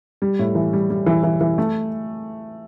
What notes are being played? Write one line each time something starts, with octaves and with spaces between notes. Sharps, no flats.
G3
A2
E3
G3
G3
E3
E3
E3
A3